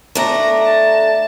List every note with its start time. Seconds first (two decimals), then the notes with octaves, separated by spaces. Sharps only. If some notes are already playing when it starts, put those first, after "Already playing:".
0.15 A3 D4 A#5
0.64 A5